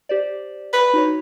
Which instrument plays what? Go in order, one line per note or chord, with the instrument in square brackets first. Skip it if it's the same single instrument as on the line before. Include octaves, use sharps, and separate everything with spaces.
[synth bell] G4 C5 D5
[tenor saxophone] B4
[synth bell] D#4 F#4 C#5